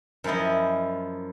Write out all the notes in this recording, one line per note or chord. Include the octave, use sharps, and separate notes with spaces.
F#2 F3 E4 D#5